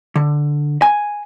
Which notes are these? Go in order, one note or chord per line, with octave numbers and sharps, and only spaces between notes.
D3
G#5